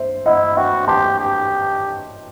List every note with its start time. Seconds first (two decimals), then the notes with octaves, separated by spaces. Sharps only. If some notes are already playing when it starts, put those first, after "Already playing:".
Already playing: C5 E5
0.26 E4 D#5 F#5
0.57 F#4 E5 G5
0.87 G4 A5 C6
1.19 G4